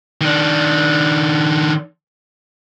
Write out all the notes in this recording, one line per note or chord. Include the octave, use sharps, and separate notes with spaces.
D#3 D4